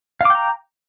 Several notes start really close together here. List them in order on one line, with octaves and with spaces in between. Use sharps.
F5 D6 G5 A#5